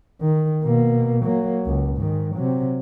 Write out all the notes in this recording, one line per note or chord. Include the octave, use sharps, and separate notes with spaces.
D#3
B2 A#3
F#3 A#3
C#2
G#2 D#3
C3 F#3